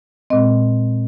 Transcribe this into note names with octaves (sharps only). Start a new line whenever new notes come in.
A#2 G#3 C4 D#5